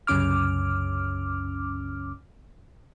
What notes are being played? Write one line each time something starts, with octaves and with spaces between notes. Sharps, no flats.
C2 F#2 C#3 C#4 D6 F6